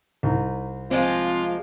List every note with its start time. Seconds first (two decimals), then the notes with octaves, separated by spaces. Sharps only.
0.23 C2 D#4
0.91 F3 G#3 A#3 C4 F4